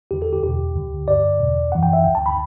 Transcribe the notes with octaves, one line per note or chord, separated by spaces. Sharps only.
E2 D3 G4
A4
G4
E2 B2 G4
D2 D3
G2 D3 D5
E2 B2
F#2 E3 F#5
G5
E5
D2 D3 G5
A5
B5